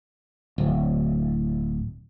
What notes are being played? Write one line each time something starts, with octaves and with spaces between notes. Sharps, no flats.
D1